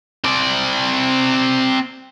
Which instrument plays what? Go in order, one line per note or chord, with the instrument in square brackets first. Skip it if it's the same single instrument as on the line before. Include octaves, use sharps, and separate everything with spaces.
[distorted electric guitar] C4 D5